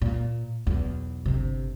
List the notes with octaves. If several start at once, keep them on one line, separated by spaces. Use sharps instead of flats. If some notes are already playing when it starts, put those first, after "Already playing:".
A#2
B1 E2
G1 C3